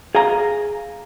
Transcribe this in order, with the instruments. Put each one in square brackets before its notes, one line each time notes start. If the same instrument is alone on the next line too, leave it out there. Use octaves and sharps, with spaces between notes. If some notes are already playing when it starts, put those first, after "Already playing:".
[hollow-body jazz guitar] G#4 F5 G#5 A#5